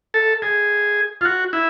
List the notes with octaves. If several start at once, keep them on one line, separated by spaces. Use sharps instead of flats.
A4
G#4
F4
F#4
E4